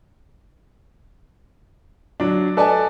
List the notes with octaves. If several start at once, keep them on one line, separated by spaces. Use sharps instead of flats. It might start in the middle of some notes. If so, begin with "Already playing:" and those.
F#3 D4
A4 B4 D5 D#5 G#5 A5